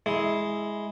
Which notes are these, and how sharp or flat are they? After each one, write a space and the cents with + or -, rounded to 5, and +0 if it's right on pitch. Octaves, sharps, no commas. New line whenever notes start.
G#3 +0 E4 -15